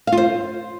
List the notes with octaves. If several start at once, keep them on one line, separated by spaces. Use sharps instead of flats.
F5
F4
C5